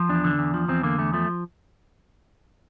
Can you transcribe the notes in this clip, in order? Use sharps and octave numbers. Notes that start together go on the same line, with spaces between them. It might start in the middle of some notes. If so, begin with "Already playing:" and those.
Already playing: F3
E2 D4
D3
E2
F3
E2 C4
D3 A#3
E2 A3
F3 A3